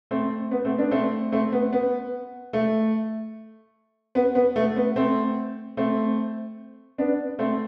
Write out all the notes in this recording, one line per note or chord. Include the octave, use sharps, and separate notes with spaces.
A3 C4
B3
A3 C4
B3 D4
A3 C4
A3 C4
B3
B3
A3
B3
B3
A3
B3
A3 C4
A3 C4
B3 D4
A3 C4